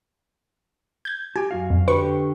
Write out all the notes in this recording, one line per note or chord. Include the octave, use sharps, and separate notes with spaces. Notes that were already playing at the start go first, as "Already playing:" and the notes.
G6 G#6
F#4 G4 G#5
F#2 F#4 F5
F2
D3 G4 B4 C#6